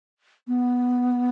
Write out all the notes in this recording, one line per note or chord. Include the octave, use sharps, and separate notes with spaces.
B3